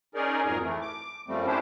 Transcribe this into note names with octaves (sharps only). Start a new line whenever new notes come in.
C#4 D#4 G#4 A#4 D5
F2 G#2 F#3 G#4 A#4
E3 A3
D6
F#2 F3 G3 A3 C4
C#4 D4 E4 G4 C5